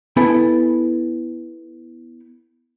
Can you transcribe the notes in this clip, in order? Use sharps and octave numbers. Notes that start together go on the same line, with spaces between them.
B3 E4 A4 G5 G#5